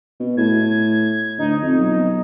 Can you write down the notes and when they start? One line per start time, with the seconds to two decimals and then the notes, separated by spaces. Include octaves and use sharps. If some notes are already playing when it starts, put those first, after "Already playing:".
0.20 B2
0.37 A2 G#6
1.38 D2 D#4
1.62 F2
1.79 B1